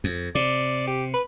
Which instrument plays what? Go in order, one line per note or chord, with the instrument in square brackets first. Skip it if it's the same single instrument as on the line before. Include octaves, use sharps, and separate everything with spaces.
[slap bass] F2
[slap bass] C3 [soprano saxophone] D5
[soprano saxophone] G4
B4